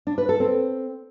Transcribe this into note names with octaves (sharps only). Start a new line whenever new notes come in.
D4
B4
A4
C4